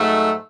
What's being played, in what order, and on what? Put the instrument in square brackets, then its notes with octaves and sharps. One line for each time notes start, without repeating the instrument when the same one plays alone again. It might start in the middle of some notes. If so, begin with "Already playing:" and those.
Already playing: [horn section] G#2 F#3 A3